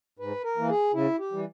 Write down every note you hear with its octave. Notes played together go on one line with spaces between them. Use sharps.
G#2 B4
A#4
E3 A#3
G#4
C#3 E4
G4
E3 G3